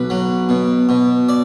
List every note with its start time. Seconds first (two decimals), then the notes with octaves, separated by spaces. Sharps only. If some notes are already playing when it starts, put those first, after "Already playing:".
Already playing: B1 B4
0.10 F#3
0.49 B2
0.89 B2
1.29 D5